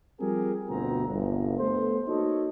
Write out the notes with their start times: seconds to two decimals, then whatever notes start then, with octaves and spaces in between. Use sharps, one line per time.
0.19 F3 G3 C4 G4 G#4 A#4
0.68 G1 D2 B2 B3 C4 A#5
1.08 G1 C2
1.58 A3 B3 A4 C5
2.07 A#3 D#4 F#4 A4 C#5 D#5